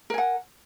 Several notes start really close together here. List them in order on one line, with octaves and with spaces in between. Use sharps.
A#4 G#5 F#5